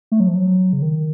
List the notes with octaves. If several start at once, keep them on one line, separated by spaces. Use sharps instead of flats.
A3
F#3
F3
F#3
C#3
D#3